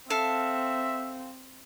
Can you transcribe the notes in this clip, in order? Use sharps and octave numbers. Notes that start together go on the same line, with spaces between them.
C4 A4 E5 F5